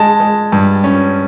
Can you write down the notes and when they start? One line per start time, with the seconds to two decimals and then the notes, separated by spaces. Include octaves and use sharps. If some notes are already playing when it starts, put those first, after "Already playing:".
Already playing: G#3 A5
0.20 G#3
0.52 G2
0.84 C#4